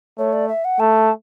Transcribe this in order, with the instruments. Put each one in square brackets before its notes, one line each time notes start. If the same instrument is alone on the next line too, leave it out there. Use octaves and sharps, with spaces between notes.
[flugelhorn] A3 [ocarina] C#5
[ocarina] D5
E5
F#5
[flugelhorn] A3 [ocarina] A5